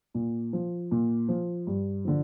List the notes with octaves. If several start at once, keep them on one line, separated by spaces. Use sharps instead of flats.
A#2
F3
A#2
F3
G2
D3 F3